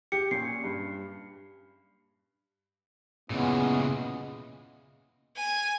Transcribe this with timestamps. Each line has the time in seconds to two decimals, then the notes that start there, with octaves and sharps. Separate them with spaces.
0.12 G4 C#7
0.31 A#2 C#4 C7
0.64 G2
3.30 A#2 C#3 E3 G#3 B3 C#4
5.36 G#5